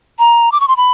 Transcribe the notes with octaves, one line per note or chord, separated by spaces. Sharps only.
A#5
D6
C#6
C6
B5